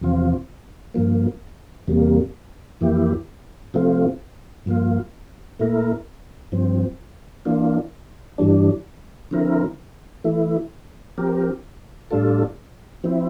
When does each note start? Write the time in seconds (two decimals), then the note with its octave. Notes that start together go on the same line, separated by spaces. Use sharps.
0.01 E2 C3 F3 C4 F4
0.94 G2 F3 A#3
1.88 E2 C3 G3 A#3
2.81 F2 E3 A#3 E4 G4
3.74 C3 F3 A3 C4 F4
4.66 G2 F3 A#3 F4
5.59 A#2 A3 E4 A#4
6.52 G2 F3 C4
7.45 E3 A#3 D4 F4
8.38 G2 E3 G3 D4
9.31 D3 F3 C4 E4 A#4
10.24 E3 A3 E4
11.18 F3 C4 G4 A#4
12.11 A2 G3 D4 F4 A4
13.04 F3 C4 E4